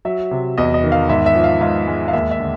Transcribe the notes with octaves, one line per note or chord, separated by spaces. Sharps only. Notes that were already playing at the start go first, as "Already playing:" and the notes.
F#3 E5
C3
E2 D#5
D#5
D#3
F5
G#2 E5
E5
F3
F5
G#2 F5
G#3
F5
D#2 E5
E5
D3